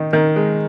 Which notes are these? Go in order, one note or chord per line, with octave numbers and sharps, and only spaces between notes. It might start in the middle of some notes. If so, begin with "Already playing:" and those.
Already playing: D#3 D#4
D#3 A#4
G#3